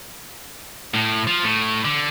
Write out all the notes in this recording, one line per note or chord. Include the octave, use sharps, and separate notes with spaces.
A2
F3
A2
D3